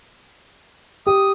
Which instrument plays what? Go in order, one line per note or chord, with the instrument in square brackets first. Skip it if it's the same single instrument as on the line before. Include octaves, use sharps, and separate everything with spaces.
[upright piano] G4 [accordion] D#6